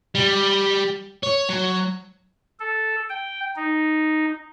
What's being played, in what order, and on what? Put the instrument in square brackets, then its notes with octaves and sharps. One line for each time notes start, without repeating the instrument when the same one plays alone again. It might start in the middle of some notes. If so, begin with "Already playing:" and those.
[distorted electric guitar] G3
C#5
F#3
[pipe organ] A4
G5
D#4